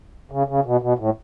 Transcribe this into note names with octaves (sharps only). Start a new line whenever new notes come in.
C#3
C#3
B2
B2
A2